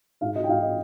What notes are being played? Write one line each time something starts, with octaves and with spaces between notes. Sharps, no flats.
G#2 F5
D#5
G5
G#2 F5
D#5